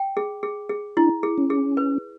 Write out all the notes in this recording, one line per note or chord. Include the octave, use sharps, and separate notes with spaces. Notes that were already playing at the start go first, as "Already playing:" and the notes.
Already playing: G5
G#4
G#4
G#4
D4 E4
G#4
C#4
G#4
B4